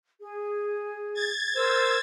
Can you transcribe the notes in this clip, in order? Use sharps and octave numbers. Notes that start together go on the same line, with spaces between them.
G#4
G#6 A6
A#4 C5 E6 G#6 A6